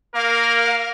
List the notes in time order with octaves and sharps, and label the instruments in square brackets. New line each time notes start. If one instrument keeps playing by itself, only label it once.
[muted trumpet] A#3 [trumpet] A#4 [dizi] F5